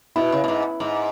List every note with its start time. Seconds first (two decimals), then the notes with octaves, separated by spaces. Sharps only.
0.16 B2 E4
0.32 C#3
0.44 B2
0.48 G#2
0.80 G#2